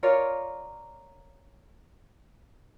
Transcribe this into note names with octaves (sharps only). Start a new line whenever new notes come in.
F4 A#4 C#5 D5